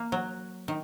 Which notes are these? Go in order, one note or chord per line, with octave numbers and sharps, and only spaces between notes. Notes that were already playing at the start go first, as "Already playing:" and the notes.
Already playing: A#3
F#3
D#3